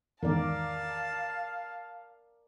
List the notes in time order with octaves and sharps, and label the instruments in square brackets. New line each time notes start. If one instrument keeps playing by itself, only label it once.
[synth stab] E2 G#2 D#3 [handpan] A#4 D5 [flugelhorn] F5 [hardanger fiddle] A5